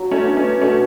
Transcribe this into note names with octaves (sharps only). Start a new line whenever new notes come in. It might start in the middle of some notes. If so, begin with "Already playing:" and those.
Already playing: F#3 F#4
A3 C#4
B3 D4 F#4
A3 C#4
B2 A3 C#4